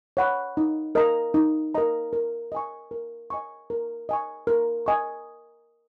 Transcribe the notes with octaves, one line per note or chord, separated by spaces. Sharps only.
C#5 F#5 B5
D#4
A#4 D#5 A#5
D#4
A#4 D#5 A#5
A#4
D#5 G#5 C#6
A#4
D#5 G#5 C#6
A#4
D#5 G#5 C#6
A#4
D#5 G#5 C#6